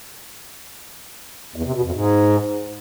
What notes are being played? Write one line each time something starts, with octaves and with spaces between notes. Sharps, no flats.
E2
C3
B2
F2
G#2